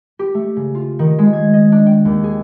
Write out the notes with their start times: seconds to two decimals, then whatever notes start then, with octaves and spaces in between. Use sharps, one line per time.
0.19 G4
0.34 A3
0.56 C#3
0.75 F4
0.99 D#3
1.19 G#3
1.33 G#6
1.54 D#5
1.72 D4
1.87 G5
2.05 D#2
2.24 G#4